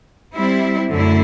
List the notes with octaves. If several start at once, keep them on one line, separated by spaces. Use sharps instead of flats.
G3 C4 E4
F#2 D3 A3 E4